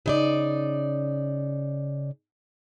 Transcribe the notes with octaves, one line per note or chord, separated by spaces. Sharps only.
C#3 D#4 D5